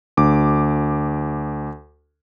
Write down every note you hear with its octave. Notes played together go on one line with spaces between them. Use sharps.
D2 D6